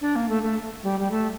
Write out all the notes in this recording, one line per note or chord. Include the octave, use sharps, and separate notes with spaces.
D4
A#3
A3
A3
G3
G3
A3